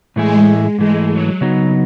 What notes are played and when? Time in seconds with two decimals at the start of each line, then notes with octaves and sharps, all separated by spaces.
0.16 A2 E3 G#3 A3 E4 G#4
0.78 G#2 E3 G#3 A3
1.11 F#3
1.41 C#3 F#3 B3 D#4